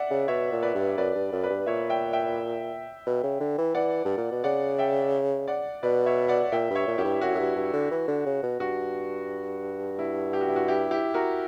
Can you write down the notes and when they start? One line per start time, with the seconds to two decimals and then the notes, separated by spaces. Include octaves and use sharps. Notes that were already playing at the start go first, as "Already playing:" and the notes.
Already playing: D5 E5 F#5
0.10 C#3
0.28 B2 C#5 E5
0.52 A#2
0.62 B4 D5
0.74 G2
0.98 F#2 B4 D5
1.15 G2
1.32 F#2
1.43 B4 D5
1.50 G2
1.66 A#2 C#5 E5
1.89 E5 G5
2.13 E5 G5
3.06 B2
3.23 C#3
3.40 D3
3.58 E3
3.75 E3 D5 F#5
4.05 G2
4.18 A#2
4.32 B2
4.44 C#3 D5 F#5
4.79 E5 G5
5.48 D5 F#5
5.83 B2 B4 D5
6.06 C#5 E5
6.28 D5 F#5
6.52 A#2 E5 G5
6.70 G2
6.75 C#5 E5
6.87 A#2
6.98 F#2 E4 G4
7.05 G2
7.21 F#2 F#4
7.34 F#2
7.39 G2
7.55 G2
7.73 D3
7.91 E3
8.08 D3
8.26 C#3
8.43 B2
8.59 G2 F#4
9.99 E4
10.33 G4
10.41 F#4
10.48 E4
10.56 F#4
10.68 E4 G4
10.91 E4 G4
11.14 F#4 A#4